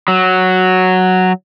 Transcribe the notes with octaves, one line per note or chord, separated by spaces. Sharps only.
F#3